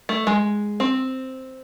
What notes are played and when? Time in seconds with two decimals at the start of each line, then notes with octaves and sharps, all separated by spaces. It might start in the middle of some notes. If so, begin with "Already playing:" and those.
0.09 A3
0.27 G#3
0.80 C4